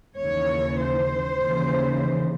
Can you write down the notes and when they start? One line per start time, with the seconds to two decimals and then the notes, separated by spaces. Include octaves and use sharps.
0.19 D#2 C#3 E3 C#5
0.81 C5
1.44 D#2 C#3 E3